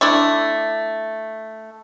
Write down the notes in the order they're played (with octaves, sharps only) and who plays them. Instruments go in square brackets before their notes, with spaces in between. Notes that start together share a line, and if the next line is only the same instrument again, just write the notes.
[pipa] A3 D4 E4